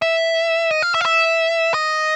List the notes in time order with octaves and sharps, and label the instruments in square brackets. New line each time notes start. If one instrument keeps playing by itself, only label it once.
[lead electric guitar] E5
D#5
F5
E5
F5
E5
D#5